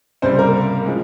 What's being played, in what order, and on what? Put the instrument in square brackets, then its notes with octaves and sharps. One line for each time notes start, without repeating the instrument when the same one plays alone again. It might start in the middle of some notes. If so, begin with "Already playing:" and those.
[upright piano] C#2 C3 G3 C4 C5
A#3 A#4
F3 G#3